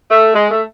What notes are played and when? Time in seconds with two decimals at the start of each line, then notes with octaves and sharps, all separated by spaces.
0.10 A3
0.34 G#3
0.51 A3